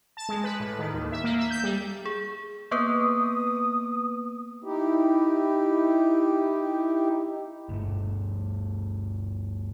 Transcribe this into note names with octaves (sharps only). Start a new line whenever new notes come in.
A5
G#3
B4
A2
D#3
D#2
E5
A#3
E5
G6
G3
G#4
A#3 B3 B4 D#6
D#4 E4 G4
D2 G2 A3